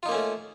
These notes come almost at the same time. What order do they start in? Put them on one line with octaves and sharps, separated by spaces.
F4 D#4 A#3 C#4 A3